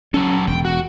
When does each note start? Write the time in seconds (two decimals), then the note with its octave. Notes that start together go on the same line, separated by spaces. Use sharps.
0.14 F#3 C#4 A4
0.47 E1 G5
0.65 F#4